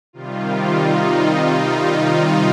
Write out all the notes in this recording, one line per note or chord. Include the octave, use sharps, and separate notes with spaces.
C3 D#3 G3 F4
D#4